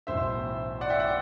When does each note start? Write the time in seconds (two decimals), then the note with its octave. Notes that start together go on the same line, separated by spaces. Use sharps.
0.07 B1 A2 E3 C5 E5
0.81 D5 F#5
0.90 E5 G5
1.00 D5 F#5